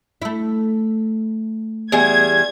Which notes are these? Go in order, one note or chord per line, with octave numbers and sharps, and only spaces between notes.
A3 E4
E2 G3 G#4 G#6